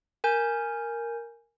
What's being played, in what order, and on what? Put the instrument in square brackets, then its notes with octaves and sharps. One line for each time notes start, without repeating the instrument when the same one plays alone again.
[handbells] A#4 G#5 G6